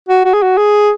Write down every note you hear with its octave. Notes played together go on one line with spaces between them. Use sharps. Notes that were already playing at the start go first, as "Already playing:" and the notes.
F#4
F#4
G#4
F#4
G#4